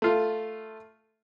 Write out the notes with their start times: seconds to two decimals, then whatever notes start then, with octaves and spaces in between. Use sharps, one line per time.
0.02 A3 F4